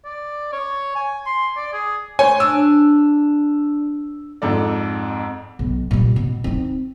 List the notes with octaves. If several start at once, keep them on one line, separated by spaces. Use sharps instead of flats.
D5
C#5
G#5
C6
D5
G#4
C5 C#5 G#5
D4 E6
F2 G#2 A4 D5
B1
A#2 G3
B2
C4 D#4